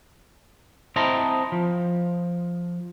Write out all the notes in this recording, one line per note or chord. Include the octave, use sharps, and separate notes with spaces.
C4 E4 C5 D#5 A5 A#5
F3